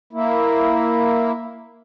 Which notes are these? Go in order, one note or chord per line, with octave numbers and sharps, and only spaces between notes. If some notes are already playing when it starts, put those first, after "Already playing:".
A#3 E4